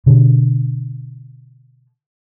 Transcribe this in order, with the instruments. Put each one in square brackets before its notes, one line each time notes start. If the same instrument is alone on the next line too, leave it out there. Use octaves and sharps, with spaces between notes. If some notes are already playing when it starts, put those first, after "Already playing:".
[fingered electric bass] B2 D3